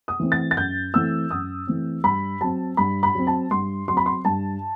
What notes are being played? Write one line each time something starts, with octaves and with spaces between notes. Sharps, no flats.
D#6
E3 A3 C4
A6
A6
F#2 G6
E3 A3 C4 E6
F#2 D#6
E3 A3 C4
G2 B5
F#3 C4 A5
G2 B5
B5
F#3 C4
A5
G2 C6
F#3 C6
C4 B5
C6
G2 A5